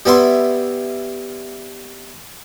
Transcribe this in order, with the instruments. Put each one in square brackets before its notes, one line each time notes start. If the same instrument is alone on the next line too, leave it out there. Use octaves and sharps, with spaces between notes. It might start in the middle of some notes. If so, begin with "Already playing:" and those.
[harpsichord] G3 B3 E4 C6